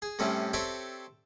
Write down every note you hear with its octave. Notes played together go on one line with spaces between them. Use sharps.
G#4
A2 C3 G3 C4 C#4 G4
C4 G4 A4 C#5 D5 E5